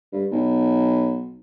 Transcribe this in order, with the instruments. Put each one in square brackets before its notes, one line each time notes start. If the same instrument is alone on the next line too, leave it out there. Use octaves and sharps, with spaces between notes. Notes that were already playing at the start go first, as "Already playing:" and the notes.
[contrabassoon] G2
B1